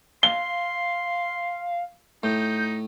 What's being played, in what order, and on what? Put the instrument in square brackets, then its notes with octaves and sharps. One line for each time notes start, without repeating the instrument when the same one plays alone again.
[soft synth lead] F5 [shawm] C6 [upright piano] G7
[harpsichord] A2 [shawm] D#4 [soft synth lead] G6